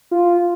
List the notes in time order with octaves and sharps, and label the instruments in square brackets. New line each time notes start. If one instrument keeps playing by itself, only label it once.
[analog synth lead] F4